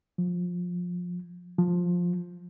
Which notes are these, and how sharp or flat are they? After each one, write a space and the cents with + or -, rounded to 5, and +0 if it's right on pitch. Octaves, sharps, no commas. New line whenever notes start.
F3 +20
F3 +10